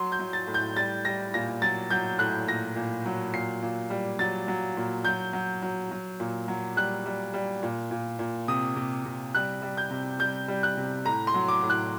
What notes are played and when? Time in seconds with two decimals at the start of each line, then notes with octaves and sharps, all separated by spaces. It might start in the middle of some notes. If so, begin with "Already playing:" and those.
Already playing: F#3 C6
0.12 G6
0.19 F#3
0.33 A6
0.48 A2
0.54 G6
0.76 G3 A6
1.05 G3 A#6
1.34 A#2 A#6
1.62 F#3 A6
1.90 F#3 G6
2.19 A2 F#6
2.48 A#2 A#6
2.76 A#2
3.06 F#3
3.34 A#2 C7
3.62 A#2
3.90 G3
4.19 F#3 A6
4.48 F#3
4.77 A#2
5.05 F#3 G6
5.33 F#3
5.62 F#3
5.91 F#3
6.20 A#2
6.48 F#3
6.76 G3 F#6
7.06 G3
7.34 G3
7.63 A#2
7.91 A#2
8.19 A#2
8.48 C3 D#6
8.76 C3
9.05 C3
9.35 G3 F#6
9.62 G3
9.77 G6
9.91 C3
10.19 G3 G6
10.48 G3
10.63 F#6
10.77 C3
11.05 A2 A#5
11.27 C6
11.34 F#3
11.48 D6
11.63 A2
11.70 F#6